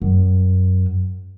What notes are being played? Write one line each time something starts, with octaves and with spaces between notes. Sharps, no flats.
F#2